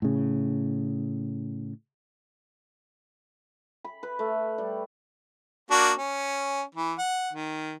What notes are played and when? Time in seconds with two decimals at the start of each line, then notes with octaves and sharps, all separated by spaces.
0.02 A2 C#3
3.84 B5
4.03 B4
4.19 A3
4.58 G3
5.71 A#3 D4 F#4
5.98 C#4
6.75 E3
6.98 F#5
7.33 D#3